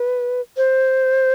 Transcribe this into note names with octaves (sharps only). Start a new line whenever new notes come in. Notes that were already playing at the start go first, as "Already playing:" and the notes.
Already playing: B4
C5